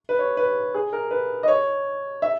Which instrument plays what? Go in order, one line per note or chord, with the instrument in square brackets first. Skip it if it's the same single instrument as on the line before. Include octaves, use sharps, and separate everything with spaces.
[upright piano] B4
C#5
B4
G#4
A#4
B4
D#5
C#5
E5